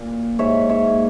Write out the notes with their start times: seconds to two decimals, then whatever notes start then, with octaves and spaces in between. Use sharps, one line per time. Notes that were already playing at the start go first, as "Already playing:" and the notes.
Already playing: A#2
0.39 G#2 C#5 E5
0.69 C#5 E5
0.85 A#3